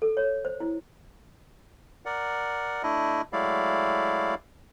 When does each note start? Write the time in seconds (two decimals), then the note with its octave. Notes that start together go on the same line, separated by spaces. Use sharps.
0.02 A4
0.17 C#5
0.45 C5
0.60 E4
2.06 A#4 D5 F#5
2.83 A3 D4 E4 D#5
3.33 F#3 G#3 A3 E4 D5 F5